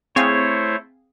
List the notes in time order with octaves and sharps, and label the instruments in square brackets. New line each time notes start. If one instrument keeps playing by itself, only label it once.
[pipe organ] A3 E4 C5 [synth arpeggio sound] C4 G#4 F5 [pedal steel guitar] C#5